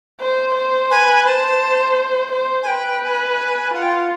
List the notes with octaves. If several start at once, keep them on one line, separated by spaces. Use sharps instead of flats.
C5
C5
B4 G#5
C5 A5
C5
G#5
B4 G5
G#5
F4 F#5
G5
F#5